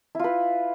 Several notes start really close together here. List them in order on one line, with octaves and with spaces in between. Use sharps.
E4 F4 B4